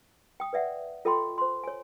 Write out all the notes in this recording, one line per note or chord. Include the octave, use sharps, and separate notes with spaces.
G5 D#6
B4 D5 E5 F#5
F4 A4 D#5 G5 B5 C6
C5 C6
C#5 G#5